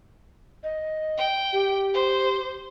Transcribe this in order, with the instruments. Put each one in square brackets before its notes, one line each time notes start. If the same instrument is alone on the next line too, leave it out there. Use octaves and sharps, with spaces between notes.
[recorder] D#5
[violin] G5
[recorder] G4
[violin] C5